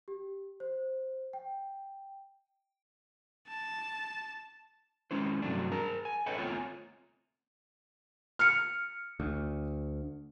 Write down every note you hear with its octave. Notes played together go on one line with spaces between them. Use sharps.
G4
C5
G5
A5
G#3 C#4 E4 C5
G2 C3 F#3 A3 D4
G#4 A#4 A5
G#5
A4 B4 C#5 D#5 G5
A3 B3 C4 F4 C#5 G#5
F6 C#7
D2